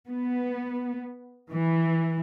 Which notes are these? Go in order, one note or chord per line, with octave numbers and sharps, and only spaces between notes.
B3
E3